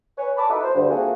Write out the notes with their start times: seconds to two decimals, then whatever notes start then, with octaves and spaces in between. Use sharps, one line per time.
0.18 B4 C#5 G#5
0.37 A5 B5 D6
0.49 D#4 E4 F#4 A4 B4
0.63 C5
0.75 D2 G2
0.89 A3 A#3 C4 F4 F#4 G#4